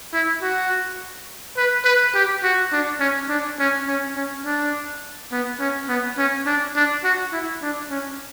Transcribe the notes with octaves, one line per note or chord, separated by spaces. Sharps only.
E4
F#4
B4
B4
G4
F#4
D4
C#4
D4
C#4
C#4
C#4
D4
B3
C#4
B3
C#4
D4
D4
F#4
E4
D4
C#4